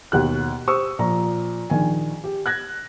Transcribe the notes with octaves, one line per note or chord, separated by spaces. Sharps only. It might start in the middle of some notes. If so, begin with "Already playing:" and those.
D#2 B2 F#6
G4 C5 C#6 D#6 E6
A#2 F3 A#5
A#1 D#3 G#5
G4
F#6 G#6 A#6